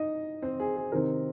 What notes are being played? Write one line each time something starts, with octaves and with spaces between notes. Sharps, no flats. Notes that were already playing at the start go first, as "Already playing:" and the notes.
Already playing: D#4 D#5
C4 C5
G#4
G#4
C3 D#3 C4 D#4 A#4